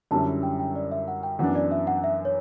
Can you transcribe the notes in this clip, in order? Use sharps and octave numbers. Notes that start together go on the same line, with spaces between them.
F#2 D3 G3 C#4 E4 A5
G5
G5
D5
E5
F#5
G5
F#2 E3 B3 D4 F#5
D5
E5
F#5
E5
C#5